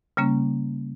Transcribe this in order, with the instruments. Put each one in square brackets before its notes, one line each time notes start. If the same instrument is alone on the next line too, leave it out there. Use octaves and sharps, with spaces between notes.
[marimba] C#3 G3 A#3 C#4